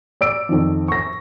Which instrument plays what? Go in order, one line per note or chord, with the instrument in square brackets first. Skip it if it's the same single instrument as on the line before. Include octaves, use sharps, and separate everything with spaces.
[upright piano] D5 E6 D7
F2 D#3 F3
C#6 A#6